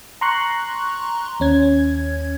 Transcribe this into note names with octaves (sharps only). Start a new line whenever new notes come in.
A#5 C6 C#6 F#6
D#2 C#4 G#6